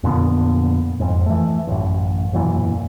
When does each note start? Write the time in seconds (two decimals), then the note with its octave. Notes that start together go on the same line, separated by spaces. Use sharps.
0.03 F2 A#2 D3 B3
1.00 F2 G#2
1.26 E3 A3
1.67 A1 F#2
2.33 E1 F#2 A#2 E3